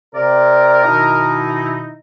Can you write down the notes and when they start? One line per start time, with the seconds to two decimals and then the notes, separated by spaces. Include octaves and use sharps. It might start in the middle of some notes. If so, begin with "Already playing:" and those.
0.15 C3 A#4 D5
0.85 B2 D#3 D#4 E4